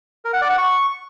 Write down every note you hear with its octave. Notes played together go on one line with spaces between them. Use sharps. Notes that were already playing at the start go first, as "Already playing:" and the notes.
A#4
F#5
D5
F#5
C#6